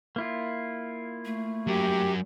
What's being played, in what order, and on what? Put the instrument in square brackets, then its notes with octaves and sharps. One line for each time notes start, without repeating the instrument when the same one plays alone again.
[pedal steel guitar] A#3 E4 F4
[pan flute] A3
[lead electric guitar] F#3 A#4 [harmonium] G4